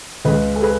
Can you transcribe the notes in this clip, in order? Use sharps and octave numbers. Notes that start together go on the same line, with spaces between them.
C#2 C#3 G#3 B4 D#5
A4
G#4 B4